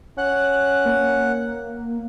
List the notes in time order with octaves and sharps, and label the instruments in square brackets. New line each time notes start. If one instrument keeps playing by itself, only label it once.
[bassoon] C#4 [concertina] F#5 [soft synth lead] F#6
[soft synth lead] A#3